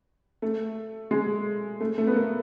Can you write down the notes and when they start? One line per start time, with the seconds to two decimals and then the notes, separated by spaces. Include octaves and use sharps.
0.42 A3
1.11 G#3
1.80 A3
1.98 A3
2.07 B3
2.16 A#3